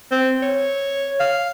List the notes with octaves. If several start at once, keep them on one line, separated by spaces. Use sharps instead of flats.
C4
C#5
F5